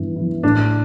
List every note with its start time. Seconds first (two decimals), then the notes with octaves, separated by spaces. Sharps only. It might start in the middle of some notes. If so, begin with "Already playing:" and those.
Already playing: G2 E3 B3 E4
0.16 E3 B3 E4
0.43 A2 D4